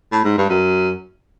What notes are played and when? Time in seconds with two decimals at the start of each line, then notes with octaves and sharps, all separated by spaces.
0.12 A2
0.25 G#2
0.38 G2
0.50 F#2